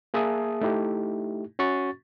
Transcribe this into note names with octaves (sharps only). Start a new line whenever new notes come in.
A#3 G#4 E5 A5 D#6
A3 D#4 E4 G4
C#4 F#4 C#6 A6